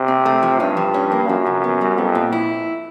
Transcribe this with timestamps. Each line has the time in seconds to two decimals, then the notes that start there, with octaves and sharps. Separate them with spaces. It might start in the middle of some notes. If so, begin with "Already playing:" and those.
Already playing: C3
0.08 C4
0.26 A3
0.43 F3
0.60 G2 C#4
0.77 F3
0.94 C#4
1.12 A#3
1.28 F#2 F3
1.46 C#3
1.64 B3
1.81 G3
1.98 F2 B3
2.15 A#2
2.32 E4